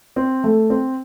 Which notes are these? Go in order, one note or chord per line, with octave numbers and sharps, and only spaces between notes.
C4
A3
C4